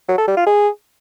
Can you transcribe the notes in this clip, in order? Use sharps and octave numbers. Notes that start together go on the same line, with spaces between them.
F#3
A4
G3
F4
G#4